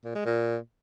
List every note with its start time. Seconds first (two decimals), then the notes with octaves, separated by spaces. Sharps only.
0.05 A#2
0.15 G#3
0.26 A#2